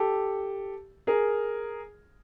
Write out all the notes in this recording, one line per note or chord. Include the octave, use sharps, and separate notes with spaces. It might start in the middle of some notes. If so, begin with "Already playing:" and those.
Already playing: G4 A4
G#4 A#4